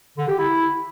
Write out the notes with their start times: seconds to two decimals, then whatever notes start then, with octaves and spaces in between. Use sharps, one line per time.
0.18 D3
0.28 G4
0.39 E4